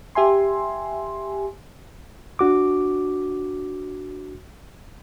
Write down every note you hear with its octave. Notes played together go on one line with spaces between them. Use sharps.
G4 E5 G#5 C6
D4 F#4 D6